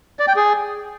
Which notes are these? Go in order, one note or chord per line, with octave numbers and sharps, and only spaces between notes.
D5
G5
G#4